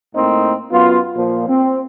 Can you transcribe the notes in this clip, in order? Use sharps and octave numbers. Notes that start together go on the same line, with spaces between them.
A2 A#3 C4 D#4
F#2 B3 F4
A#2 F3
C4